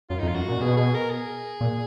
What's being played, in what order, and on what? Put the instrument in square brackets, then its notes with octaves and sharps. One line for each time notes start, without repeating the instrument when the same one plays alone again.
[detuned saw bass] F#2 [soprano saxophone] F4
[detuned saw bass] F2 [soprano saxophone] D#4
[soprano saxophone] F4
[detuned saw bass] F#2 [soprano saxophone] F#4
[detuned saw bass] A#2
[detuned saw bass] B2 [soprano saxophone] G#4
[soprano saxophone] G#4
A#4
G#4
[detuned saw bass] A#2